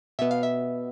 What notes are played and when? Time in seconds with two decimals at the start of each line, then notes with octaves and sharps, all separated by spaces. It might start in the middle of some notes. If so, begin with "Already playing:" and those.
0.19 B2 B3 E5
0.31 F5
0.43 E5